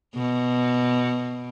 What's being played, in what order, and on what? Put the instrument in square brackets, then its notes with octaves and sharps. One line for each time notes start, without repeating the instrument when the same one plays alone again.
[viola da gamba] B2